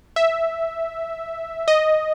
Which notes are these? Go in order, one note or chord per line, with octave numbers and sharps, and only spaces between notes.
E5
D#5